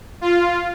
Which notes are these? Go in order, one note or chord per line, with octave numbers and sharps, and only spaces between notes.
F4